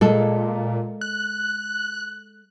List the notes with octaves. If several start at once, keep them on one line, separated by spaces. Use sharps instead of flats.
A#2 G#3 A4
F#6